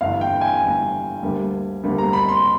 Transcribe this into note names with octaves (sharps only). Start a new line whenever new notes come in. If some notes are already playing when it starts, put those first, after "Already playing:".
G1 G2 E3 F5
G5
G#5
G1 G2 E3
D2 D3 G3 A#3
D2 D3 G3 A#3
A#5
B5
C6